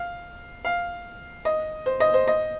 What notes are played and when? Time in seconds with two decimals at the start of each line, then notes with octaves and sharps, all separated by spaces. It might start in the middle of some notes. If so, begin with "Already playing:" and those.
Already playing: F5
0.65 F5
1.45 D#5
1.86 C5
2.00 D#5
2.14 C5
2.28 D#5